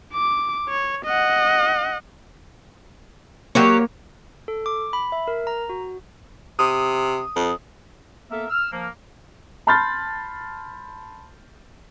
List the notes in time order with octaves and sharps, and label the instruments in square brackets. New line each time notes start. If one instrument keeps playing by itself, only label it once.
[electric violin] D6
C#5
D#5 F#5
[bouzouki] F#3 G4 C#5 [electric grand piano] A#3
[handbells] A4
D6
B5
E5
A#4
A#5
F#4
[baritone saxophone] C3 [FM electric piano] D#6
[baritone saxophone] F2
[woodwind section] A#3 B3 A4 A#4 E5
E6 F6
F3 A#3
[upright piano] A5 B5 C6 F6 G6 A6